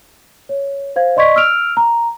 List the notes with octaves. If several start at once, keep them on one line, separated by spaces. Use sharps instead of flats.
C#5
C5 F5 G#6
D5 D#5 C6 C#6 G#6 B6
E6 F6 D7 F7
A#5